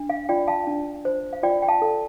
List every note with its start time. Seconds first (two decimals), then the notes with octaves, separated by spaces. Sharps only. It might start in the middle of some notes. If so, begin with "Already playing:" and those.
Already playing: D4
0.10 F5
0.29 F4 D5 G5
0.48 F5 A5
0.67 D4
1.05 C5
1.33 F5
1.43 F4 D5 G5
1.62 G5
1.68 F5 A5
1.82 A4